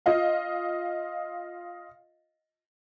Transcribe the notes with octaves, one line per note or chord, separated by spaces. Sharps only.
F4 D#5 F5